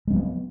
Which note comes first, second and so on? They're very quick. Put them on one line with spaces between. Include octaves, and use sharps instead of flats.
G#3 C#4 F#3 B3